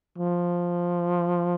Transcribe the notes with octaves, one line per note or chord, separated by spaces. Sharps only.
F3